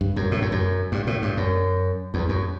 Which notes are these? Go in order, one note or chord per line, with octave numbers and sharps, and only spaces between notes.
G2
F#2
A2
F#2
F#2
G2
A2
G2
F#2
E2
F#2